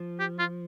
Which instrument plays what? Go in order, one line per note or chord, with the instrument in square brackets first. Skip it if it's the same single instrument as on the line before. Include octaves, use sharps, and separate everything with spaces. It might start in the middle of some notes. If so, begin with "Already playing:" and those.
Already playing: [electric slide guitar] F3
[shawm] G4
F4